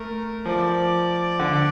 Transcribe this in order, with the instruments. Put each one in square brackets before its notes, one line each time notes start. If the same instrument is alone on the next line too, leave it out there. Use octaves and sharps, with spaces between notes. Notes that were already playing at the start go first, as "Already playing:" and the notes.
Already playing: [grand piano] A3 [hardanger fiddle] A#4
[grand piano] F3 [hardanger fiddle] D5
[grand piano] D3